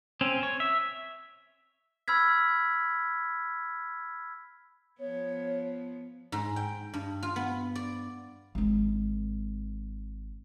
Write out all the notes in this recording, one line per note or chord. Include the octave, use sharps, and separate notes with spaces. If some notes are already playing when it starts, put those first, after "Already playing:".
C4 C#4
C#5
E5
B5 E6 F6 G#6 B6
F3 B3 C#5
G#2
G5
G2
F4
B3
D5
G#1 C4